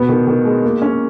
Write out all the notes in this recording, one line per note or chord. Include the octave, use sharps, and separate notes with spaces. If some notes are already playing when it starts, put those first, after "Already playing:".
Already playing: B2 B3
D#3
D#3
G#3
A#3
C#4